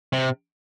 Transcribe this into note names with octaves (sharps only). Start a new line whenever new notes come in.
C3